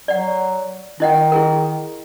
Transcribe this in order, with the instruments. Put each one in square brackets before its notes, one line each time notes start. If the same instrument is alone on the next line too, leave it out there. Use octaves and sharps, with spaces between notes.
[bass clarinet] F#3 [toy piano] D5 F#5
[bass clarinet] D#3 [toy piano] E4 D#5 F#5
[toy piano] E4 G#4 A#4